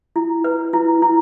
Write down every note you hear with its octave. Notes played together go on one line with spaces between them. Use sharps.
E4
B4
E4
E4